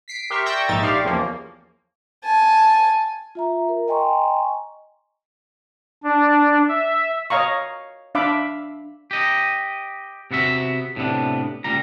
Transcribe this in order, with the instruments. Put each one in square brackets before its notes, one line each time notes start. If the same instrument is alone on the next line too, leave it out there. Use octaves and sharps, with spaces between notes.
[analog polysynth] B6 C7 D7
G4 A#4 E5 C6 C#6
D5 G5 C#6 E6 G6 A#6
A#1 G#2 D#4 E5 A6
G4 D5 F5 C6 C#6
E2 C#3 F3 A#3
[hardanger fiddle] G#5 A5
[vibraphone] F4 E5 A#5
A#4
D#5 G5 G#5 A#5 C6 C#6
[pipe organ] D4
E5
[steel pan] C#5 D#5 F5 A#5 C#6
D4 E5 F5 B5 D6
[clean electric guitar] G4 D#5
C3 B3 F#4 E5
A2 C3 B3 D4
C#2 A#2 G3 A#5